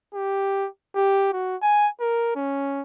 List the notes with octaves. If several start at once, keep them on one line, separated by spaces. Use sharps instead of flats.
G4
G4
F#4
G#5
A#4
C#4